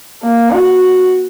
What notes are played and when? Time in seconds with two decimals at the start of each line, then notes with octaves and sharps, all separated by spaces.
0.23 A#3
0.52 F#4